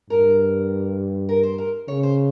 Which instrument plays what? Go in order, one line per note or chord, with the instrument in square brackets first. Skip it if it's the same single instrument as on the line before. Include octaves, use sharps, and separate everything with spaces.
[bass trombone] G2 [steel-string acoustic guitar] A#4
[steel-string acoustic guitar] A#4
C5
A#4
[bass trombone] C#3 [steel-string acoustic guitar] C#5
[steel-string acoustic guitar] C5